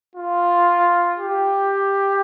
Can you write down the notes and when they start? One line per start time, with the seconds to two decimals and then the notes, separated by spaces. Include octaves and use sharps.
0.16 F4
1.18 G4